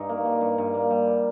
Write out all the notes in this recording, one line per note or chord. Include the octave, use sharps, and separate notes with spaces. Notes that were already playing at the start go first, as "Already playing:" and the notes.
Already playing: G2 C#4 D#4
A#3
G3
G2
G2
A#3
G3